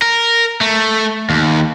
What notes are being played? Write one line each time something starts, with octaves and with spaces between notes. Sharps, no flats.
A#4
A3
D#2